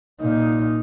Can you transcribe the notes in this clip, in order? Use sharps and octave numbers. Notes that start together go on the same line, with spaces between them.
A#2 D#4